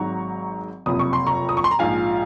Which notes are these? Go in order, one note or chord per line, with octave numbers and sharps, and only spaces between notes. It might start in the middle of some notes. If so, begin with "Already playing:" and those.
Already playing: G#1 G#2 F#3 A#5 C#6
F#1 F2 C3 D#6
C#6
C6
A#5 C#6
D#6
C#6
C6
A#5
A#1 G#2 F3 F5 G#5